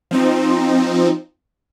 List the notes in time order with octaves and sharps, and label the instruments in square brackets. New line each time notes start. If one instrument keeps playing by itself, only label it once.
[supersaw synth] F3 C4 D#4